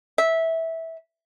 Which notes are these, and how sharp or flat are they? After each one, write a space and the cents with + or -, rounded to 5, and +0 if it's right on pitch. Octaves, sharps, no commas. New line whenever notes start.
E5 -15